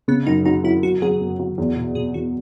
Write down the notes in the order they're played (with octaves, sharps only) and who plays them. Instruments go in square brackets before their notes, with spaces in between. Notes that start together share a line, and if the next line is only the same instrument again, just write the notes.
[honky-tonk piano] C#3 [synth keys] B3
[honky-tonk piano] F#2 [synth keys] D#4
[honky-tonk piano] F#3 [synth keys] D#4
[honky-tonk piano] F#3 [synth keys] E4
[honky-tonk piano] F#3 [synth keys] F#4
[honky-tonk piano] F#3 [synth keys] G#4
[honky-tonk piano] F#2
F#3
E2
B2
[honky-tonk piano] B2 [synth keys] G#4
[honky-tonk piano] E2 [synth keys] F#4